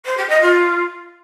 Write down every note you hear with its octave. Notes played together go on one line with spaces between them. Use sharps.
C5
G4
D#5
F4